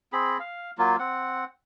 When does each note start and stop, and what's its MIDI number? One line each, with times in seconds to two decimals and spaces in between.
0.13 0.38 60
0.13 0.38 68
0.13 0.38 83
0.39 0.71 77
0.78 0.96 54
0.78 0.96 58
0.78 0.96 65
0.99 1.45 60
0.99 1.45 78